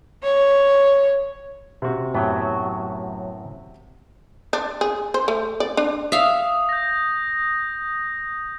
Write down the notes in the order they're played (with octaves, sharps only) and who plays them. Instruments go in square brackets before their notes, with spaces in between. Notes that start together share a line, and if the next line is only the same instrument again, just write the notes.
[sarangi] C#5
[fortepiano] C3 F#4
[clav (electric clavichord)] F#2 A2 B3 [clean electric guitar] F#3
[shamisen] D4
G#4
C5
A3
D5
D4
[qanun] E5 F5 [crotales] D#6
[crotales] G6 A#6